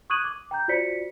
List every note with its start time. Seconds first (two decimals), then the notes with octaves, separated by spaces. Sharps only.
0.10 C#6 D#6 F#6 G#6 D#7 F#7
0.24 D6
0.51 G5 A#5 G6
0.68 F4 F#4 C5 D5 B6 C#7